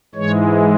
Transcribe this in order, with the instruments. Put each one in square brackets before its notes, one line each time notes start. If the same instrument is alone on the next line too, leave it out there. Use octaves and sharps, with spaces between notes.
[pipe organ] G#2 E3 G#3 C#5